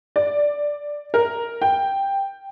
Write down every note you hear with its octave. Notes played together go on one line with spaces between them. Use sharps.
D5
A#4
G5